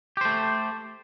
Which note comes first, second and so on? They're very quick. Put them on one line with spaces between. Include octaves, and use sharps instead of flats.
G4 C5 A3